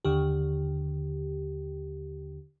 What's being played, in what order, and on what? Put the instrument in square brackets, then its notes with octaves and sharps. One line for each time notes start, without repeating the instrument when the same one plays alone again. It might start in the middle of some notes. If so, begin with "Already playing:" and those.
[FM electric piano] D#2 D3 G4